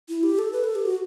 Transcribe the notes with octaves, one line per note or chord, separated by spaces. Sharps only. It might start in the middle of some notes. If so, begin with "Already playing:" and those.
E4
G4
A4
B4
A4
G4
F#4